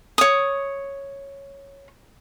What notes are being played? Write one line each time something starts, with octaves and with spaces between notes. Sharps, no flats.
C#5 D#6